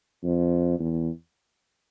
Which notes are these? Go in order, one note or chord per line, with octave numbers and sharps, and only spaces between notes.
F2
E2